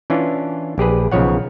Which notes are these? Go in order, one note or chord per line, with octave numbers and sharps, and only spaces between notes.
E3 C#4 D4 F4
A#1 G4 G#4 B4
B1 C#3 F3 C#5 F#5